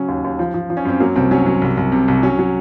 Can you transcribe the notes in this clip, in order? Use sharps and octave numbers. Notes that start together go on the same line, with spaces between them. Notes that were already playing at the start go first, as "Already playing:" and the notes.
Already playing: C#3 F#3 C#4
D#2
D#2
F3
F3
F3
C#4
F#2 C4
F#3 A#3
C2 C4
F#3 C#4
F#3
C2
C2
C3
C2
F#3 C#4
F#3